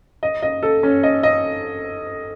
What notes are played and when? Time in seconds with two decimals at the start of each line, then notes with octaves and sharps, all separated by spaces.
0.23 D#5
0.42 D#5
0.63 A4
0.83 C#4
1.03 D#5
1.23 D#5